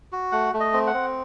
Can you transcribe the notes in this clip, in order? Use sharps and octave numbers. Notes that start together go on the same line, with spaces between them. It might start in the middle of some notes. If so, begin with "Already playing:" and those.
F#4
A3 F#5
A3
D#5
C4
F#5
C4